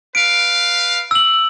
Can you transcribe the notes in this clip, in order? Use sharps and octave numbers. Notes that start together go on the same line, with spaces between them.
B4 F5 D7
E6 F#7